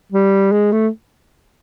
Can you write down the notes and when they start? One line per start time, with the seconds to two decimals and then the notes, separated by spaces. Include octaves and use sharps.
0.12 G3
0.52 G#3
0.72 A3